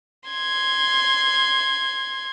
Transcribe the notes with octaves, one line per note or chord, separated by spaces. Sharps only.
C6 G#6